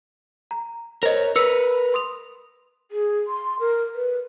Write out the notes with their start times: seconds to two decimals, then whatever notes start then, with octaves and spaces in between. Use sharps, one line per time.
0.51 A#5
1.03 A#4 C5 C#5 D#5
1.36 A#4 B4 E6 C#7
1.94 C6 D#6 F7
2.91 G#4
3.27 C6
3.60 A#4
3.95 B4